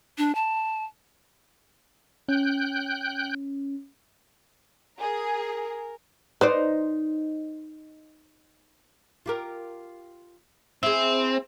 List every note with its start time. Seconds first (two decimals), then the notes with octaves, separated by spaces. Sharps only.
0.18 D4
0.35 A5
2.28 C#4 G5 F#6 G6
4.99 G#4 A#4
6.41 D#4 B4 C5 D5
9.26 F4 G4 A#4
10.83 C4 E4 G#4